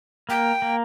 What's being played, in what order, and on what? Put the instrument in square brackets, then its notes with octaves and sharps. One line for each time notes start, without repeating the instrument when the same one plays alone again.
[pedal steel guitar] A#3 [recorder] G5
[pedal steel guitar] A#3